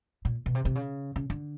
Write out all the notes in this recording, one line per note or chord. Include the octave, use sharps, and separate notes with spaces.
A#2
B2
C3
C3
C#3
C#3
D3